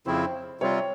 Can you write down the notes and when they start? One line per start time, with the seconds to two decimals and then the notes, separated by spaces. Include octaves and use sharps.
0.06 F2 C#3 F3 C4 E4 C5
0.60 C3 G3 C4 F4 C#5